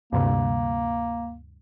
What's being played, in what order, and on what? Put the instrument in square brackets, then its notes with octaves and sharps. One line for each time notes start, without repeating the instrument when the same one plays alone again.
[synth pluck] D2 G2 C3 [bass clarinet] A#3